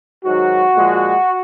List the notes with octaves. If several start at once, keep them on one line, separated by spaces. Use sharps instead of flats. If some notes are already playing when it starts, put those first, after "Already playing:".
G#2 D#3 F#3 F#4
A#2 F3 G#3